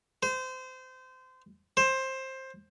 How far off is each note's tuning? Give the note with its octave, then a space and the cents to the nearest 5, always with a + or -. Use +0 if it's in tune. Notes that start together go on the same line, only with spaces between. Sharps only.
C5 -25
C5 +15